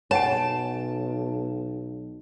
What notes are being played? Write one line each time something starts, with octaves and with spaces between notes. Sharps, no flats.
B1 C#5 F#5 G#5 A5